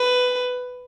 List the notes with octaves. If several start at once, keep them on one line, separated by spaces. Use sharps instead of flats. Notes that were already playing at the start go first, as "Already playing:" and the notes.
Already playing: B4